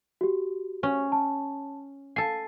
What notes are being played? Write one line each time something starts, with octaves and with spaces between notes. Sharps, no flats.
F#4 G4
C#4
A5
A4 G#5 C7